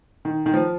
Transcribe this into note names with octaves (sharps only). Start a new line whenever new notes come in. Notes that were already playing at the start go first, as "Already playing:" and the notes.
D#3
D#3
F3